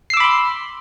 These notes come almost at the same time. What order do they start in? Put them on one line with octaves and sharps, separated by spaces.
C7 E6 D6 B5 C6